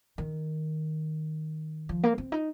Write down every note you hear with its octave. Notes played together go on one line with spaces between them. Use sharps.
D#3
F3
A#3
C4
D#4